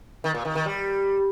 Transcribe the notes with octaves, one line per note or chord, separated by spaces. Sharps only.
D#3
A#2
D#3
D#3
G3